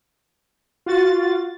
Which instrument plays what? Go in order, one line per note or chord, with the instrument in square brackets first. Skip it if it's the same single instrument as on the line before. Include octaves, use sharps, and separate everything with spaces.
[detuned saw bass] F4 [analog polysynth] F#4 A6